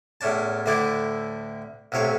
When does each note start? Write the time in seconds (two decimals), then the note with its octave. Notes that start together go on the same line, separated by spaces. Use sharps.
0.21 E2 A2 C#4 D4 A5
0.66 D2 A2 D3 D4 E4 D5
1.92 B1 A2 C3 C#5 F5